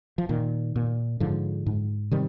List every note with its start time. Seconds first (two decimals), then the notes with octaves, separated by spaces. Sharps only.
0.18 F3
0.29 A#2 D#3
0.76 A#2
1.20 G#2 D3 F3
1.66 G#2
2.11 C3 D#3 G3